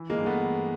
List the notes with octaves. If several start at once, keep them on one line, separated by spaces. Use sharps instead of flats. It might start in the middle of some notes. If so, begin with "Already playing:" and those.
Already playing: E3
G#3 A#3
G2
A3 B3
E3